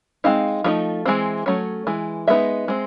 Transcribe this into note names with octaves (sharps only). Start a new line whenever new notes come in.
G#3 C4 D#4 F5
F3 A3 C4 D#4
E3 G#3 C4
F#3 A3 C#4
E3 G#3
G#3 B3 D#4 E5
G#3 C4